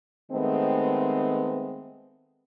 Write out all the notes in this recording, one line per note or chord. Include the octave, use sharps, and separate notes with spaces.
D#3 G#3 A3 B3 C4